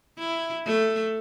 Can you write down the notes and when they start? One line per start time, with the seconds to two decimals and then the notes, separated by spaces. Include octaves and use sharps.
0.19 E4
0.66 A3